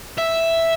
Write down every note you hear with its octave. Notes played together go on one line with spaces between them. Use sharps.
E5